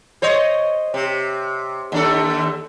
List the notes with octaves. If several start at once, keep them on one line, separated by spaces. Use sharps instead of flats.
C5 C#5 D#5
C3
D#2 D4 A4